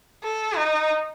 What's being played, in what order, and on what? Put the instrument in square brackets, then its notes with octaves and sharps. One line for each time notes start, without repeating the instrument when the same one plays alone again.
[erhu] A4
D#4